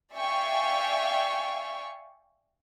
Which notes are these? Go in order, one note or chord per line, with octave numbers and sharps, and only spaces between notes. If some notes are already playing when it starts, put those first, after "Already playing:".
D5 E5 F5 G5 G#5 C#6